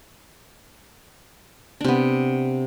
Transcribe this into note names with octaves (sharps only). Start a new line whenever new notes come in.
C3 B3 D4